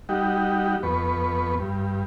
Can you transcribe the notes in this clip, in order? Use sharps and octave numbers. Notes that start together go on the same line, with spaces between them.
G3 D#4 F#4 G4
F2 B3 B4 C#6
G2